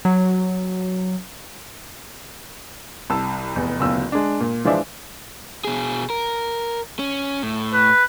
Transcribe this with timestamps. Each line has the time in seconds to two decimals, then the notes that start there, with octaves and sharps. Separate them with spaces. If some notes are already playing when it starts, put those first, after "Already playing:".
0.05 F#3
3.10 C2 A5 E6
3.55 F1 E2
3.80 F#1 D2 B2 F4 E6
4.12 G#3 D4
4.40 A#2
4.65 E3 F3 G#3 D4 D5 E5
5.65 B2 G#4
6.10 A#4
6.99 C#4
7.43 A2
7.73 B4